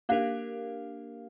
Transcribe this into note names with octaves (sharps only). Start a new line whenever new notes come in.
A#3 D4 G4 A#4 F5